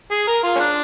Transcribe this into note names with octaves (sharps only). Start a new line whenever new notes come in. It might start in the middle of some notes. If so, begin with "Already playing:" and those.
G#4
A#4
F4
C#4
D4